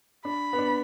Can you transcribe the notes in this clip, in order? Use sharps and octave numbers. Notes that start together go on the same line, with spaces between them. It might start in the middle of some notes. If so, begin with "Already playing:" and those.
D4 B5
B3
D4